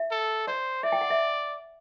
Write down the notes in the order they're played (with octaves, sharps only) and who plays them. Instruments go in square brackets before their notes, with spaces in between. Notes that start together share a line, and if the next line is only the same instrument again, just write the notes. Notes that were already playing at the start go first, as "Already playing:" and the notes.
Already playing: [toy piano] E5
[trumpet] A4
[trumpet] C5 [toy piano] D5
[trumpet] D5 [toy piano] E5
[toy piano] G5
F#5
E5